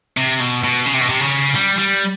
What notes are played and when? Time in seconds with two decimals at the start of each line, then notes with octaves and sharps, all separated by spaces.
0.17 C3
0.40 B2
0.64 B2
0.86 C#3
0.94 C3
1.01 B2
1.09 C3
1.21 C#3
1.55 G3
1.78 G3